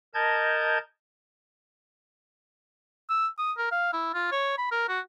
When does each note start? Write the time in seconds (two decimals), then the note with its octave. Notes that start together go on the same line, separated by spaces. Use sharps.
0.14 A#4 D#5 A5 G6 G#6
3.10 E6
3.38 D#6
3.58 A#4
3.72 F5
3.93 E4
4.14 F4
4.32 C#5
4.58 B5
4.71 A#4
4.89 F#4